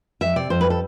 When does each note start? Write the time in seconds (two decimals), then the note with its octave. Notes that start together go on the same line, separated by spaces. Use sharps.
0.21 F2 E5
0.36 C3 D5
0.50 F2 C5
0.61 B4
0.65 G3
0.70 A4